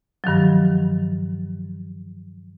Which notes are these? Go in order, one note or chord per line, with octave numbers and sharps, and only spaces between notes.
G2 D#3 F3 F#3